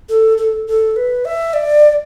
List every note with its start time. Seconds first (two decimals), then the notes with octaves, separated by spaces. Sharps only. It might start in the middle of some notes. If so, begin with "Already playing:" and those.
0.09 A4
0.38 A4
0.67 A4
0.96 B4
1.25 E5
1.53 D5